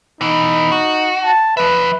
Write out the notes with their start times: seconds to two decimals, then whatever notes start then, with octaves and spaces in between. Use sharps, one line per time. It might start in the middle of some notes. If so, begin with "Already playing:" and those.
0.21 B2 E3 D#4
0.72 F#4
1.25 A5
1.57 F3 B4 E5